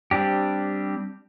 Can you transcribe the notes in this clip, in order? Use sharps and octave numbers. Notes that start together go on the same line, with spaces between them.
G3 C4 D4 G4